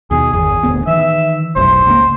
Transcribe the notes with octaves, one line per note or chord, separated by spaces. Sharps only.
D#2 B2 G#4
G1 E2 G#4
D1 D2 B3
D#3 E3 E5
F1 B1 G2 C5
C#2 A#3